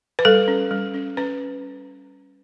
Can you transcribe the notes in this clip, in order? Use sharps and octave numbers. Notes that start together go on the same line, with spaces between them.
B4
G3 A4
C#4
G3
C#4
C#4 B4